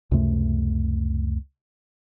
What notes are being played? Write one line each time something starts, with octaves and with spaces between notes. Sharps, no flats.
C#2 F#2 C3 A3